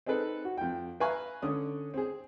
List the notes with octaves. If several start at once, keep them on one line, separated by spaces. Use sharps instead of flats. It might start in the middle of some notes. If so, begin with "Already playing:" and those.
C4 D#4 G#4 A4 B4
F#4
F2 G5
B4 E5 F5 G#5 A#5 C#6
D3 C#4 D#6
C4 G#4